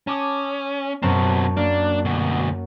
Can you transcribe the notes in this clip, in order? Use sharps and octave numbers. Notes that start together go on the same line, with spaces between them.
C#4 A5 D6 D#6
F#2 B2 F#3 C4 A5
A#3 D4
D2 B2